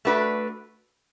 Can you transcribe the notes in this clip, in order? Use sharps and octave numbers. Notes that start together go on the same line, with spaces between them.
A3 D4 F#4 B4